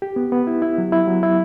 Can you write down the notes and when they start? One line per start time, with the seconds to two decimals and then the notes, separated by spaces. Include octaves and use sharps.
0.02 G4
0.16 B3
0.32 B3
0.47 E4
0.62 E4
0.78 F#3
0.92 E4
1.07 F#3
1.23 E4